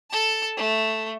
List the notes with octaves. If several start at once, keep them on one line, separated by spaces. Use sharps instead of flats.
A4 A5
A3